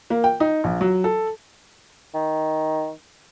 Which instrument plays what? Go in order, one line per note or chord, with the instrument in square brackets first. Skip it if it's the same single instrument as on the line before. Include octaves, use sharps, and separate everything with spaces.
[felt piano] A#3
G5
D#4
A#1
F#3
A4
[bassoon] D#3